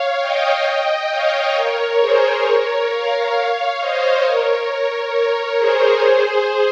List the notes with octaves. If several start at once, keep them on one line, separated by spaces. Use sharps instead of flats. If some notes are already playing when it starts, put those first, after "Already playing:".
Already playing: C#5 F5
D#5 G5
D#5 G5
C#5 F5
A#4 C#5
G#4 C5
A#4 C#5
C#5 F5
C#5 F5
C5 D#5
A#4 C#5
A#4 C#5
G#4 C5
G#4 C5